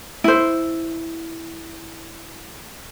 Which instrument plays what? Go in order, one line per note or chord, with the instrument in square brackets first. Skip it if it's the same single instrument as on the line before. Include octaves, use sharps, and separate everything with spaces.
[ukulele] E4 C5